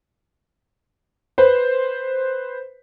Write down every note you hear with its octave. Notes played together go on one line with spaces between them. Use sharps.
B4 C5